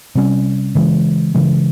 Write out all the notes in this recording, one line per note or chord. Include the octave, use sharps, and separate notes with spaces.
C3 G3 C#4
C#3 E3 G#3
C#3 E3 G#3